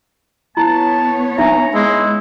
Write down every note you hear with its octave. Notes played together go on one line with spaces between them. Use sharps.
B3 E4 C#5 A5
D4 D#4 E5 A#5
G#3 E4